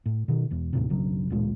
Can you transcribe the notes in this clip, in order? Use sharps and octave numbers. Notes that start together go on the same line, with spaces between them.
A2
B2 D#3
E1 E2
D#2 A2 C3
F#1 B1 C#3 F#3
A1 D2 A#2 G#3